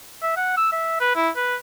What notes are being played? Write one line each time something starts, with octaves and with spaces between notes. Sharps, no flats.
E5
F#5
E6
E5
B4
E4
B4